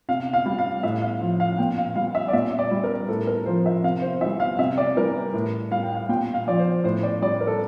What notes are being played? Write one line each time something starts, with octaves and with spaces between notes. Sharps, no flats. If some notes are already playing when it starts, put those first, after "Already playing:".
C3 F5
F5
G3
F5
A2 E5
F5
F3
F5
A#2 G5
F5
G3 F5
E5
D5
A#2 E5
D5
G3
A#4
A2 A4
A#4
F3 C5
E5
C3 F5
C5
E3 G3 E5
F5
C3 E5
D5
E3 G3 A#4
A2
G3 F5
G5
F5
A#2 G5
F5
F3 D5
C5
A2 C5
D5
G3 D5
A#4
A4